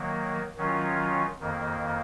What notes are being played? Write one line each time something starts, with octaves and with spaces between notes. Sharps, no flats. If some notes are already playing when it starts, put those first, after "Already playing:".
Already playing: D#3 F#3 A#3
D#3 F#3 C#4 F4
F2 D#3 A#3